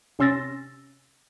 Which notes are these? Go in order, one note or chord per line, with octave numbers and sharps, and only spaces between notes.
C3 C#4 C6 E6 A6 A#6